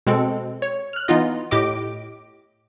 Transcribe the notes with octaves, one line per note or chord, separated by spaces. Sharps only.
B2 G#3 C4 A4
C#5
F6 F#6
E3 B3 D#4 F4 D#5
A2 G4 D#5 D6 D7